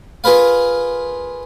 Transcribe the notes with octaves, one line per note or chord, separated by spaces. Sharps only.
F4 G#4 A#4 B4 F5